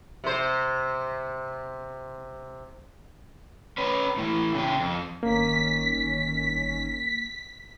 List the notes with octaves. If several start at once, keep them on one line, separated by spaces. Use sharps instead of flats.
C3 C5
C#4 B4
A2 E3
C#3 G4
F2
G1 D#3 A#3 C#4 B6